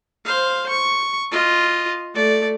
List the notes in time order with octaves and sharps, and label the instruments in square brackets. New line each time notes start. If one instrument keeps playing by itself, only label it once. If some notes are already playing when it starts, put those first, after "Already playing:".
[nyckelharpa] C5 F5
C#6
F4 D#5
A3 D5